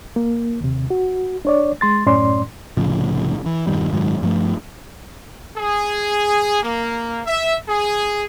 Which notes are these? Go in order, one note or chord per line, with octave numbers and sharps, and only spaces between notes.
A#3
D#2 C3
F#4
D4 C#5 D5
G#3 C6 A6
F#2 A2 C#4 D5 C6
C2 A2 C#3 F3
E3
E1 G2 D#3 G3
F#1 G#2 D#3 F#3
G2 F3 A3
G#4
A#3
E5
G#4